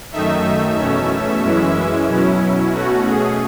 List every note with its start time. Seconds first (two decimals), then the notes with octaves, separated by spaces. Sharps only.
0.12 F#2 D#3 A3 D#4 E5
0.77 E2 B2 A3 C#4
1.42 F#2 E3 G#3 C#4 E4
2.08 B2 F#3 C#4 E4
2.73 B2 A3 C#4 F#4
3.06 G#4